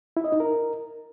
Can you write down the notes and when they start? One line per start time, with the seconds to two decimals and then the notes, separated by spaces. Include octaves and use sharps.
0.17 E4
0.24 D#5
0.32 D#4
0.40 A#4